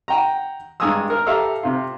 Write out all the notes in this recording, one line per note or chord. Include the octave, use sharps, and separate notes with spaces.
F#5 G5 A#5
G2 G#3 G#5 A#5 D#6 E6
A#4
G4 A4 E5 F5 A#5 E6
C3 F4